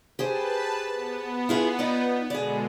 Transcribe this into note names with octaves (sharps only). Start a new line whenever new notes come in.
G4 G#4 B4 C5 A5
B3
E4 F4 G#4
D#4 F4 D5
B2 D3 G#3 G#4 D5